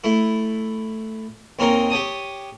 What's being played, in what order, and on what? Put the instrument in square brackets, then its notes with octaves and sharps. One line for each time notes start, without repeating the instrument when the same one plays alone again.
[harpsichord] A3 E4
D#2 C4 C#4 D#4 A#4
G4 C#5 A5 D#6